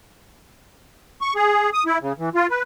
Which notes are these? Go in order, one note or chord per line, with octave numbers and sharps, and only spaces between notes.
C#6
G#4
D#6
E4
C#3
E3
F4
B4